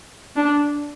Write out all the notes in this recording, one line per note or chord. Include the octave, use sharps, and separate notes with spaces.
D4